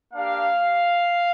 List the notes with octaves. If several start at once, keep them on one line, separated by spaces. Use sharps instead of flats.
A#3 D4 G4 F5